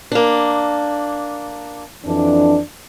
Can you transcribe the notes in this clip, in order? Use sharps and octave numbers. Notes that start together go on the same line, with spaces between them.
A#3 D4
F2 E3 D4